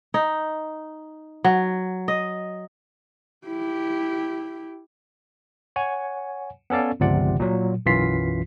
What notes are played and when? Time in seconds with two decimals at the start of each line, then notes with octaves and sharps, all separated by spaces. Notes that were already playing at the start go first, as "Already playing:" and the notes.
0.14 D#4
1.44 F#3
2.08 D#5
3.47 E4 G4
5.76 C#5 F#5 G#5
6.70 B3 C#4 A4 D5 F5
7.00 G1 C#2 C3 F3 D5 F#5
7.39 A#2 F#3
7.86 B1 F#2 E3 F4 B6 C7